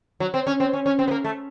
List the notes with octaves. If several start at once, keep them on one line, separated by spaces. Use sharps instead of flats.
F#3
C4
C#4
C4
C#4
C#4
C4
B3
A#3
A3